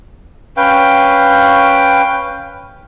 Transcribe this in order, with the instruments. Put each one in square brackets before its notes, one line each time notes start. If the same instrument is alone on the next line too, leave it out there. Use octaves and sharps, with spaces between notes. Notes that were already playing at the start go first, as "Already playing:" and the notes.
[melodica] C#4 B4 F5 G5